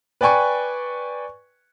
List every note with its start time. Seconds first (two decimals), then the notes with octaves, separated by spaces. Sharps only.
0.21 B4 D5 G5 G#5 C#6